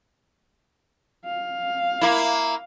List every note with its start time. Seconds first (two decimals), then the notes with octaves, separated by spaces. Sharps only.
1.25 F5
2.01 A#3 E4